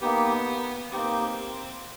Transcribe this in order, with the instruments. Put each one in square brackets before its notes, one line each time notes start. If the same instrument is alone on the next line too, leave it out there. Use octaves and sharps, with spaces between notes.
[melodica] A#3 D#4 G4 [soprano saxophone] B3
[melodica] A#3 D#4 G4 [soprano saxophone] C4